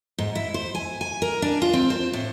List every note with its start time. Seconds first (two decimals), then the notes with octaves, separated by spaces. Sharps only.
0.18 G#2
0.35 E4
0.54 C5
0.75 G#5
1.01 G#5
1.22 A#4
1.42 D4
1.62 F4
1.73 C4
1.90 C5
2.13 A2